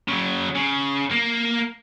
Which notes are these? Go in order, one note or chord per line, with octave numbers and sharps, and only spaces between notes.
C#3 F#3
C#3
A#3